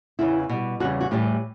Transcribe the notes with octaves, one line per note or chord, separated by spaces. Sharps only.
E2 C#3 E3 E4
B2 G3
E2 C#3 G3 F#4
F#4
A2 E3 G3 G4